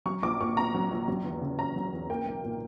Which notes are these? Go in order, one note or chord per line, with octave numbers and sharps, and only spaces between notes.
F#3 C#6
A#1 D6
A#2 C#6
B3 A#5
F#3
A#1
F#3
E2
C#3
C#4 A#5
F#3
E2
A#3 G5
B1
A#2